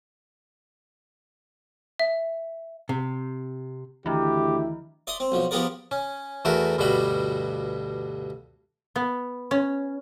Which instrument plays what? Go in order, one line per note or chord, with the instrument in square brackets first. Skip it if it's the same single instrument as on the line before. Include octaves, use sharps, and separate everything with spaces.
[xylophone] E5
[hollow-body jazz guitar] C3
[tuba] D2 [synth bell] D#3 E3 [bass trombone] E4 [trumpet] G4
[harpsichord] D5 E5 C6 D#6
C4
B1 F3
F3 B3 G4 G#4 A#4 D5
C#4
E2 A3 F#4 A#4 B4 A#5
D2 G2 B2 G3 F#4 B5
[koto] B3
C#4